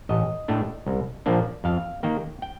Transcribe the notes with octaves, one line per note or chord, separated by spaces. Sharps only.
A1 D#5
A2 A3 D4
C2
A#2 F3 A#3 D4
F2 F5
D#3 A#3 G5
G5